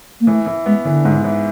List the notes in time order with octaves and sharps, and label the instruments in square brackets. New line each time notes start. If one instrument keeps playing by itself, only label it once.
[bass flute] A#3
[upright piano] E3 [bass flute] A3
[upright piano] E3
[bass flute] G#3 [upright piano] B3
[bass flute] D3 [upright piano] E3
[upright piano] G#2
E3